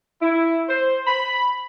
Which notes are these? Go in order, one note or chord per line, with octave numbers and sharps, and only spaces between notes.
E4
C5
B5